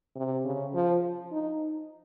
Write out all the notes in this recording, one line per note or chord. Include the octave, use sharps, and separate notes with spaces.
C3
C#3
F3
D#4